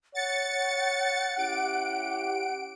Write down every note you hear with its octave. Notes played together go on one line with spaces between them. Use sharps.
C#5 F#5 A6 C#7
C#4 E4 G4 D7